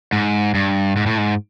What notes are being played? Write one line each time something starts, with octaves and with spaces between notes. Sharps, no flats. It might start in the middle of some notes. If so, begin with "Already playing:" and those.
G#2
G2
G#2
A2
G#2